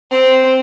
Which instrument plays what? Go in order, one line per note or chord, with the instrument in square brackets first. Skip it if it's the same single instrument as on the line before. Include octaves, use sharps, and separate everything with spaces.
[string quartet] C4